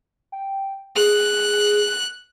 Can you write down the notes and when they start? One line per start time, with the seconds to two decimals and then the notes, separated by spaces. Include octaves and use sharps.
0.32 G5
0.96 G#4 F#6